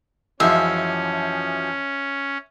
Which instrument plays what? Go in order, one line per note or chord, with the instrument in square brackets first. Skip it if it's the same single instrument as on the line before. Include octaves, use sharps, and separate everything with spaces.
[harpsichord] F#2 G#3 [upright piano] E3 F3 F4 [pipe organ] C#4 [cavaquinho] E5